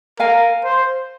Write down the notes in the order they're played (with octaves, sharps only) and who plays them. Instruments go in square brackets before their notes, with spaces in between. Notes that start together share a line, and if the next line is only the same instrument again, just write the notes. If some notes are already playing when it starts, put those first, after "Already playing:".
[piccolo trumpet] A#4 [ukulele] F5 G#5
[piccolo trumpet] C5